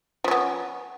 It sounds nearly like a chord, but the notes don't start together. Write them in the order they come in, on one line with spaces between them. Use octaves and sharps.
F3 C#4 B3